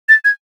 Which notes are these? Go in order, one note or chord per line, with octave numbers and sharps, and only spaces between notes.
A6
G#6